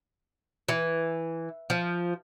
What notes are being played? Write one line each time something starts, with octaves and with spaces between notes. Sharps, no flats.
E3
F3